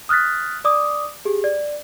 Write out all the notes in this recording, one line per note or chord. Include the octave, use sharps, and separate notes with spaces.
D#6 F6 F#6 A6 B6
D5 D6 D#6
G4 G#4
D5